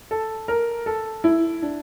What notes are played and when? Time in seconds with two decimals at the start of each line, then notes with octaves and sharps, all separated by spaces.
0.11 A4
0.48 A#4
0.86 A4
1.24 E4
1.62 D4